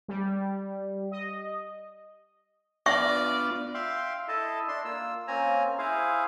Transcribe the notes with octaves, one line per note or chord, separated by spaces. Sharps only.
G3
D#5
B3 D4 F4 D5 E5 C#6
E5 F5 G5 C6
E4 A4 D#5 A5
D4 C6
A#3 F4 E6
A#3 C4 C#4 G#5 A#5
E4 G#4 C5 F5